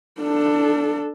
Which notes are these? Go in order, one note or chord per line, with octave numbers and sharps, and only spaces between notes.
D4 A4